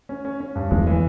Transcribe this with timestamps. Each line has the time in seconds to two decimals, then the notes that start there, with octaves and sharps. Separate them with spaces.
0.09 C#4
0.25 C#4
0.40 C#4
0.55 G2
0.71 E2 G#3
0.87 E3